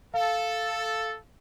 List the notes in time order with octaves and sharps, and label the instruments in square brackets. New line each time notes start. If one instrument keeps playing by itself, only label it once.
[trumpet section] A4 [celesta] F5